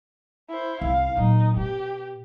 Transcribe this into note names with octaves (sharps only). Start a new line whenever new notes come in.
E4 C5
C2 F5
A#2 F#3 D#4
B2 G4